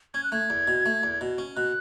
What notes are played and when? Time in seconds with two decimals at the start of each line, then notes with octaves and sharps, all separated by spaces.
0.14 C#4 G#6
0.24 F#6
0.32 A3 G#6
0.50 E2
0.68 B2
0.86 A3
1.03 E2
1.21 B2
1.38 C#4
1.56 B2 F#6